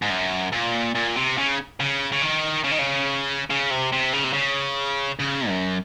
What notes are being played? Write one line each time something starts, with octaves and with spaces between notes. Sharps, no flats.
G#2
F#2
A#2
A#2
C3
C#3
C#3
C#3
D#3
C#3
D#3
C#3
C#3
C3
C3
C#3
C3
C#3
C#3
F#2